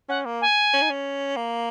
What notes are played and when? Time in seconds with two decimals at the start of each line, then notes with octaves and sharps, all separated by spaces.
0.09 C#4 F#5
0.26 A#3
0.41 G#5
0.74 C#4
0.82 D#4
0.90 C#4
1.37 A#3